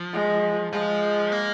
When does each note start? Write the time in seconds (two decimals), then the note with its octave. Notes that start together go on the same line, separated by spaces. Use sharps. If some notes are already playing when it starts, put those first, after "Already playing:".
Already playing: F3
0.13 G#3
0.72 F3 G#3
1.32 A#3